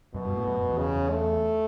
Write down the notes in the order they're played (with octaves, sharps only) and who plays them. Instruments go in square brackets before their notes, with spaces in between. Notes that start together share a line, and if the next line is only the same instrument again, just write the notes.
[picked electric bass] F#2 [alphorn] B2
[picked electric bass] G2
A2
F#2
F#2
E2
[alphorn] C#3
A3